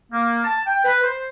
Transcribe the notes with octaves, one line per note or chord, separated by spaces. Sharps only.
A#3
A5
G5
B4
C5